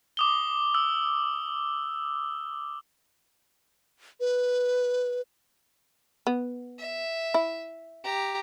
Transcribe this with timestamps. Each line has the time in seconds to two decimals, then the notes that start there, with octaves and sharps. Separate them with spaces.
0.17 D6 D#6 G7
0.75 E6
4.20 B4
6.27 B3
6.78 E5
7.34 E4
8.04 G4 A#5